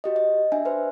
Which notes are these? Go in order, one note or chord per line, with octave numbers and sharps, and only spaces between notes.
F#4 G4 D#5
D#5
D4 E5 G#5
B4 C5